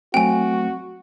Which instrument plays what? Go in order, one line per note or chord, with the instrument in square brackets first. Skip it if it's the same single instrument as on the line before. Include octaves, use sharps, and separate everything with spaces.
[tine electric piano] F#3 A3 C4 [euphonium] F#4 [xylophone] G5 G#5